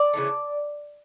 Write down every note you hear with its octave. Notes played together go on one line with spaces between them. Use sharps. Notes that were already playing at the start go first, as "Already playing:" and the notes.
Already playing: D5
C#3 E3 A3